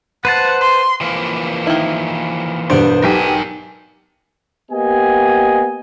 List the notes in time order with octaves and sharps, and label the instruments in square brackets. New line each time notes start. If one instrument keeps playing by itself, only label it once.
[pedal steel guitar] B4 C5 A5 [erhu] F#5
[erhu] C6
[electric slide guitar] E3 F3 A#3
[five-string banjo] D#3 E4
[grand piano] E1 G2 [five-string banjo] G3 B3 [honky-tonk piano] C5 D7
[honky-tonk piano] B1 G4 [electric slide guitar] A#4 G#5 [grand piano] B6
[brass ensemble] A#3 B3 G4 D#5 G#5